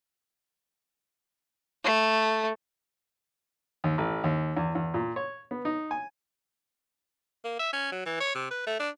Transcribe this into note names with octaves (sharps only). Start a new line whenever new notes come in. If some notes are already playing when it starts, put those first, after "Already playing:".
A3
D#2
A1
D#2
E2
E2
A#2
C#5
B3
D#4
G#5
A#3
E5
C#4
F#3
E3
C#5
C3
B4
A3
D4